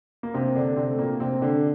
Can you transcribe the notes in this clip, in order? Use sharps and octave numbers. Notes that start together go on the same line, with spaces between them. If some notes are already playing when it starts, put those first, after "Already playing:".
A#3
C3 C4
D3 D4
C3 C4
A3
A#2 A#3
C3 C4
D3 D4